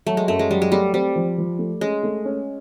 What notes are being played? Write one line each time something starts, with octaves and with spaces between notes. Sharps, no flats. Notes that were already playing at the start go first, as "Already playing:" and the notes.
F#3 A3
G#3
F#2 A3
G#3
F#3 G3
G#3
G3 A3
G3 C4
F3
F3
A3
G#3 C#4
A3
C#4